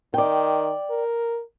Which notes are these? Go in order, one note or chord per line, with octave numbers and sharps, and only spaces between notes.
D#3 D5 G5
A#4